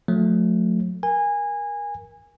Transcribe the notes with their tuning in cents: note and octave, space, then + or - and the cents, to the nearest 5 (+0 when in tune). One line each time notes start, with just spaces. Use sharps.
F#3 -45 A3 +0
A#4 +15 G#5 -20